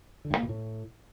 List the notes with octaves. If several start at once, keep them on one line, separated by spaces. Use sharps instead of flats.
D3
G2
A#3
B2
A2